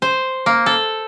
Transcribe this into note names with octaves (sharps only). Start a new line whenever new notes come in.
C5
A#3
A4